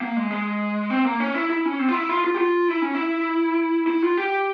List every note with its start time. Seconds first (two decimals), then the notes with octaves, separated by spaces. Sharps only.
0.01 A#3
0.17 G#3
0.31 G#3
0.90 C4
1.05 A#3
1.20 C#4
1.35 E4
1.50 E4
1.65 C#4
1.79 C4
1.88 F4
1.94 E4
2.09 F4
2.24 F4
2.34 G4
2.38 F4
2.68 E4
2.82 C#4
2.95 E4
3.87 E4
4.03 F4
4.18 G4